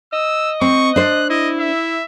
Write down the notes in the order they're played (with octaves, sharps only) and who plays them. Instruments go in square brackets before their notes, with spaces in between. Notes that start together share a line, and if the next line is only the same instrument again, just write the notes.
[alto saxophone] D#5 [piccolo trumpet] E6
[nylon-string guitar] C4 [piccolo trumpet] C#6
[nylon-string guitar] D4 C5 [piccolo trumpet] F#6
[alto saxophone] E4 [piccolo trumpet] D#5
[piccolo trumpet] E5